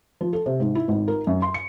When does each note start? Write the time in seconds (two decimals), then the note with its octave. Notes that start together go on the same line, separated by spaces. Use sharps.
0.21 F3
0.33 A4
0.46 C3
0.60 G#2
0.75 E4
0.88 G#1
1.08 A#4
1.27 F#2
1.42 C6
1.54 C#7